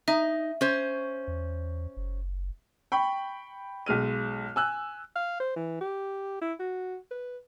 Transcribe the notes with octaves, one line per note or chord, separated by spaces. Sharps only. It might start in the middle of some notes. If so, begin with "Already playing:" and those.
D#4 E5
C#4 C5
E2
F#1
G5 B5 C#6
B1 G#3 F6 D#7
G#5 E6 F#6
F5
C5
E3
G4
E4
F#4
B4